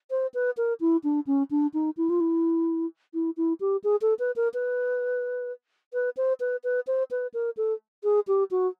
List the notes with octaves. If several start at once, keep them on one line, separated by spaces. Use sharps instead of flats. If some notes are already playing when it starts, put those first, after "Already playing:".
C5
B4
A#4
E4
D4
C#4
D4
D#4
E4
F4
E4
E4
E4
G4
G#4
A4
B4
A#4
B4
B4
C5
B4
B4
C5
B4
A#4
A4
G#4
G4
F#4